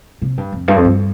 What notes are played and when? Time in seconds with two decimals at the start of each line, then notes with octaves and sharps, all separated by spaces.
0.22 C3
0.37 G2
0.53 F2
0.68 G2
0.76 F2
0.85 G2